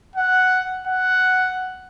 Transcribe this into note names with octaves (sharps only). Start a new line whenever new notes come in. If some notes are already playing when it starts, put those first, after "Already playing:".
F#5
F#5